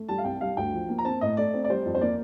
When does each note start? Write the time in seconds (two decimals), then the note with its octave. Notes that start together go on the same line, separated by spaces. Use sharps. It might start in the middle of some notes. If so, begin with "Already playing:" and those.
Already playing: A3
0.09 G3 A5
0.18 F5
0.25 C2 G5
0.41 G3 F5
0.57 D2 G5
0.73 F3
0.89 A#3
0.98 A#5
1.05 C4 A5
1.21 A2 D#5
1.37 A3 D5
1.54 C4
1.64 D5
1.70 G3 C5
1.86 F2
1.95 C5
2.01 A#3 D5